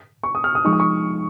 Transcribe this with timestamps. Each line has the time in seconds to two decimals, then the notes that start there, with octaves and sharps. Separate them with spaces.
0.23 C#6
0.35 D#6
0.44 F6
0.55 D#6
0.65 F3 G#3 D#4 C#6
0.73 D#6
0.80 C#6